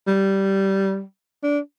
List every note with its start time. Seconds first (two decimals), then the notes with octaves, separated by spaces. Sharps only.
0.07 G3
1.43 D4